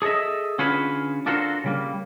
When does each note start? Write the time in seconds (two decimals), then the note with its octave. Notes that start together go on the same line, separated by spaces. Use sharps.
0.02 G#4 A4 C#5 D#5 E5
0.58 D3 C#4 F4 F#4 G#4 B4
1.26 D4 F4 F#4 A4 A#4 C5
1.64 C#3 G3 A#3